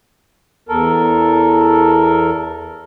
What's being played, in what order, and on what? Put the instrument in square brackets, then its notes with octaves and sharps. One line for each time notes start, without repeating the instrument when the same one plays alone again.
[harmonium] E2 A4 A#4